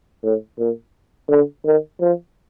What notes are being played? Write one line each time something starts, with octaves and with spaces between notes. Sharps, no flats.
A2
A#2
D3
D#3
F3